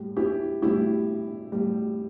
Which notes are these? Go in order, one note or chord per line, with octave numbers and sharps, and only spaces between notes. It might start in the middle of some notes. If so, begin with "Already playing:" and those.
Already playing: A2 G3
E4 G4
A2 G3 E4 G4
A2 G3